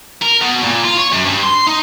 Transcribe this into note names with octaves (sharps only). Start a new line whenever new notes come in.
A#4
B2
A#2
F4
C#5
F#2
G2
C6
D#4